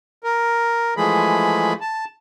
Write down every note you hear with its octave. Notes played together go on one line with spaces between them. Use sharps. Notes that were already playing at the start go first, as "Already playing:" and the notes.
A#4
E3 F3 G#3 A3 G#4 B5
A5